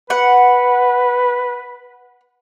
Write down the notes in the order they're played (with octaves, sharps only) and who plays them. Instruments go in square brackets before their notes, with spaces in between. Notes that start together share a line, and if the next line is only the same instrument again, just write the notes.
[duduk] B4 [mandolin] F#5